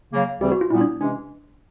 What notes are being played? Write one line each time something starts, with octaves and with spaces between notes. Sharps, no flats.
C#3 F#3 A#3
D2 C#3 E3 G3 C4 G4
F#4
F4
A#2 G3 B3 E4
D4
C3 E3 G#3 C#4 D4